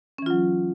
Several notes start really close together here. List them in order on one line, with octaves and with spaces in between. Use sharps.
C#4 E3 F4 F#3